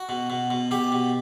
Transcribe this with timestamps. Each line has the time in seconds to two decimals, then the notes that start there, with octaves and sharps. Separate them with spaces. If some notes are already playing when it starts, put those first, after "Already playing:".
Already playing: F#4
0.09 B2
0.30 B2
0.50 B2
0.71 B2 G4
0.92 B2